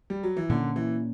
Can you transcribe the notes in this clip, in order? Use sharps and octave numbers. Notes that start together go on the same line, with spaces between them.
G3
F#3
E3
A#2 D3 A#3 C#4
E3